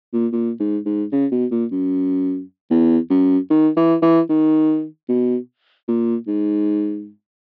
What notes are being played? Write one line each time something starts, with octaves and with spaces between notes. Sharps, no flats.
A#2
A#2
G#2
G#2
C#3
B2
A#2
F#2
E2
F#2
D#3
E3
E3
D#3
B2
A#2
G#2